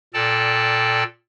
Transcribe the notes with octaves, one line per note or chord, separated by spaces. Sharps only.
A#2 A4 D5 G5 A5